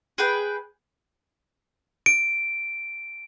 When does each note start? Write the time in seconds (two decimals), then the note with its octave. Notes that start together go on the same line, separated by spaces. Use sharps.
0.18 G#4 B4 G5
2.06 D7